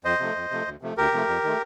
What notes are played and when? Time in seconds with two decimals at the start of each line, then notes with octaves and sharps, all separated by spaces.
0.04 F2 C5 D#5
0.20 C3 F3 A3
0.36 F2
0.51 C3 F3 A3
0.66 D2
0.82 C3 F3 A3
0.97 D2 G4 A#4
1.12 C3 F3 A3
1.28 F2
1.44 D#3 A3